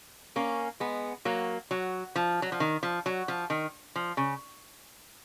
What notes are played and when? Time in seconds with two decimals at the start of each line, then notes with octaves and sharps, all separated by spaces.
0.36 A#3 C#4
0.80 G#3 B3
1.25 F#3 A#3
1.71 F#3
2.16 F3
2.42 F#3
2.52 F3
2.60 D#3
2.83 F3
3.06 F#3
3.28 F3
3.50 D#3
3.96 F3
4.17 C#3